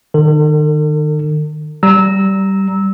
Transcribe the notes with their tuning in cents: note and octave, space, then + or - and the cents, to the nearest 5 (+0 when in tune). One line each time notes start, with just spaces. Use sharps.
D#3 -30 A4 +45
G3 -15 A#5 +0 E6 -20